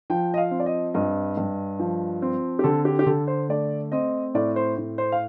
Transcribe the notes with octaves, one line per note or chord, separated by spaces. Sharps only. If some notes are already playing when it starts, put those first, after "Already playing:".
F3 G5
D#5
F5
C4
D5
D#5
G2 D#5
G2
F3
C4
G4
D3 A4
G4
G4
D3 A4
C5
A3 D5
C4 D#5
A2 D5
C5
A2
C5
F5